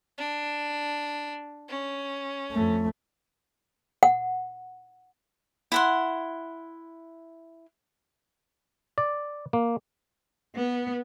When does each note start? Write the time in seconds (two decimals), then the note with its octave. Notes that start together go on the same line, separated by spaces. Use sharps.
0.18 D4
1.68 C#4
2.52 F2 A3
4.03 F#5
5.72 E4 F#5 C6
8.98 D5
9.53 A#3
10.55 B3